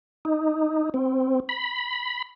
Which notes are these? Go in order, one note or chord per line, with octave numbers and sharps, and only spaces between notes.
D#4
C4
B5